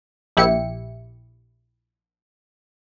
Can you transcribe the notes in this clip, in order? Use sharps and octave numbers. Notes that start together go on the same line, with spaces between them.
A#1 E4 G4 C#7